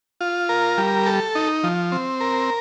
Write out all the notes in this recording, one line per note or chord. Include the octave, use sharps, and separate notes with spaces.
F4
A#4
G3
A4
D#4
F3
C4
A#4